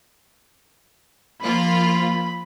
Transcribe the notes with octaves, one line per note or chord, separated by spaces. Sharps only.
F3 A#3 F4 B5